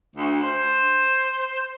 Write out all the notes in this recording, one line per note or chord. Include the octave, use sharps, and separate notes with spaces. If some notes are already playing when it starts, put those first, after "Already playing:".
D2
C5